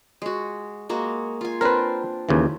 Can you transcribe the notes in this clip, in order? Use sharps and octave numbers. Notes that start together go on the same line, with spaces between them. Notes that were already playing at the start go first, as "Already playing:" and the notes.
G#3 F#4
G#3 A#3 F#4
F4 G#5
C4 D4 A#4 B4
D#2 C#3 E3